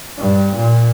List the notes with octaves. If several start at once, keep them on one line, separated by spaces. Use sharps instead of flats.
G2
A#2